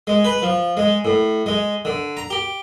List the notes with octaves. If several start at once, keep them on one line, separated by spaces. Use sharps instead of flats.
G#3
B4
F3
G#3
A2
G#3
D3
A#5
G4